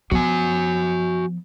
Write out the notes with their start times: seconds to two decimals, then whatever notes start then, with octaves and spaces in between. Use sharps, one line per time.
0.11 F3 B3 F#4 G#5